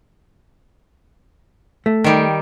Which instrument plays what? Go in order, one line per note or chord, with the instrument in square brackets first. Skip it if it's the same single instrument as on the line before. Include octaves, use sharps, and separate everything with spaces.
[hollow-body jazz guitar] A3
[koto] D#3 G3